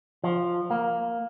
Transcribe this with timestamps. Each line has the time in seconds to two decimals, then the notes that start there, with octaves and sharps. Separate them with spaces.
0.24 F3
0.71 A#3